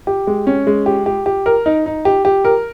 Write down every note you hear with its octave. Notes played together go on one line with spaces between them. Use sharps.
G4
G#3
C#4
G#3
G4
G4
G4
A#4
D#4
D#4
G4
G4
A#4